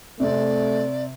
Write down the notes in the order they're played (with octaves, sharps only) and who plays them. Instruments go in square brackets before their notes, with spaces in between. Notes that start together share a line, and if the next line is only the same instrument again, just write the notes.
[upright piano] C3 C4 [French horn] A3 [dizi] D5